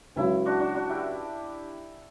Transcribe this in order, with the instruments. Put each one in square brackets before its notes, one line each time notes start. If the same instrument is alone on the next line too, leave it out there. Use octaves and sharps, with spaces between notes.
[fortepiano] C#2 C#3 F#3 C#4 [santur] E4
[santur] D4 F#4
D4 F#4
D4 F#4
E4 G4